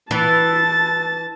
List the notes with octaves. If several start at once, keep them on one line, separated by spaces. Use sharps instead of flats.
E3 A5 A6